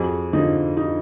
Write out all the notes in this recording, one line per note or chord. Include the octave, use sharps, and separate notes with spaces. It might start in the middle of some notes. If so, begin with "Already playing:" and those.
Already playing: F2 F#4 G#4
D3 F3 D#4
D#4